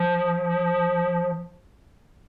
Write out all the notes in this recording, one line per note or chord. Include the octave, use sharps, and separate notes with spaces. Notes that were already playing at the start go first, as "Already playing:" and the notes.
Already playing: F3